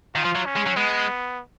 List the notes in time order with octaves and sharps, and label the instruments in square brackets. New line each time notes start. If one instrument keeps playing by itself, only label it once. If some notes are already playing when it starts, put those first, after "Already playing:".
[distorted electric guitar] D#3 [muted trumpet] F4
[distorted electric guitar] F3
F#3
[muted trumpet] C#4
[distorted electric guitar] G#3
F#3
[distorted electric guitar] G#3 [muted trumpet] B3